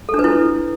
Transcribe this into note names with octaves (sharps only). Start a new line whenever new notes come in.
A4
D4
B4
E4